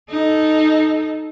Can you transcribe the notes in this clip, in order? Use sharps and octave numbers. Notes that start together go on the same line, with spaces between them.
D#4 A4